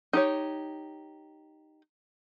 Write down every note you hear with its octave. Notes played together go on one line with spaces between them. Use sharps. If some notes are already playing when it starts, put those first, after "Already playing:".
D#4 G4 C#5